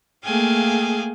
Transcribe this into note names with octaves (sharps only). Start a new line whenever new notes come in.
A3 A#3 G#4 F5 G5 G#5